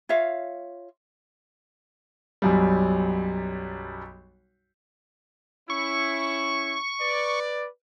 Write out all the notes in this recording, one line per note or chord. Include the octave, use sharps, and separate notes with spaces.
F4 C#5 E5 F5
B1 F#2 G3
C#4 E4 C#6
B4 D5